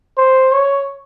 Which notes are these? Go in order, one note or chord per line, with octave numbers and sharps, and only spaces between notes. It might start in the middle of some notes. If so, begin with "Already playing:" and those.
C5
C#5